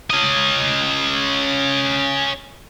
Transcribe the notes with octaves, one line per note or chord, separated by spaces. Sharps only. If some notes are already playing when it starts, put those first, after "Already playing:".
C#4 D#5